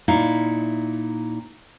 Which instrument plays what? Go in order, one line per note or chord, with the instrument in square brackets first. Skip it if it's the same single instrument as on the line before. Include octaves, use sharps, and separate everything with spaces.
[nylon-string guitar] A#2 D#4 E4 E5 F5